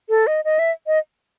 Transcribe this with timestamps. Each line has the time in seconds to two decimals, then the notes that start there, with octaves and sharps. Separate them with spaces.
0.09 A4
0.27 D#5
0.45 D#5
0.59 E5
0.87 D#5